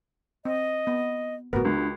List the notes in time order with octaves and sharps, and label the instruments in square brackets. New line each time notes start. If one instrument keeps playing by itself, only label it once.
[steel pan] C4 [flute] D#5
[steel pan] B3
[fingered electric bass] G1 A2 [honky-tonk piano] B3 [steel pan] F#4 A#4
[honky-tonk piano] C#2 [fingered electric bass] D4